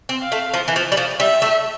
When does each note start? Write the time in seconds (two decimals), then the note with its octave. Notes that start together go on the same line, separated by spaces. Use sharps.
0.09 C4
0.20 F5
0.32 A3
0.54 F3
0.68 E3
0.76 F3
0.92 G3
0.97 F3
1.20 G3 E5
1.42 A3